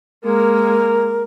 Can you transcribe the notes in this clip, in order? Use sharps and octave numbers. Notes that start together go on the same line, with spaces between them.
G#3 A#3 A#4